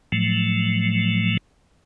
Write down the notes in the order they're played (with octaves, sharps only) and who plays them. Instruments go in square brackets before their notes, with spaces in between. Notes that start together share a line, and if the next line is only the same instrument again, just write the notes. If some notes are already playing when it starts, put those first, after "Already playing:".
[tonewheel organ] A2 F3 F#3 A3